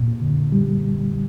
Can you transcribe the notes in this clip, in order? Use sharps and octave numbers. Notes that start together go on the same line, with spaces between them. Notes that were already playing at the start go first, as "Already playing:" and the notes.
Already playing: A#2
D3
G3